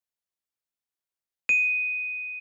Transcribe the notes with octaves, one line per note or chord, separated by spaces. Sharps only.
D#7